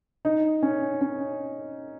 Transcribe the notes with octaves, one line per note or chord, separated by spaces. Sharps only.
D#4
C#4
C#4